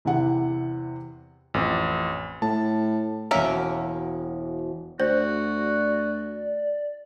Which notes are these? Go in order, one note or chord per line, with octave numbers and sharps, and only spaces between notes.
E2 C3 E3 E4 F#5
A1 F2
A2 A5
E1 A#3 C#4 F#4 E5 D7
D2 F#4 C5 D5